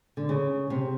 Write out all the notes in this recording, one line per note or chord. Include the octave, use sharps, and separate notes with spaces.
D3
C#3
C3